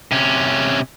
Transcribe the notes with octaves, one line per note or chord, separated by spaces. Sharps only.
C3 C#4